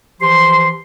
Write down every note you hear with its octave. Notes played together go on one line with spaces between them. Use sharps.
E3 F3 G4 C6